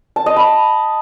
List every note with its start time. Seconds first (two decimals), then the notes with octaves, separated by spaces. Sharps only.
0.16 A5
0.26 D#5
0.36 B5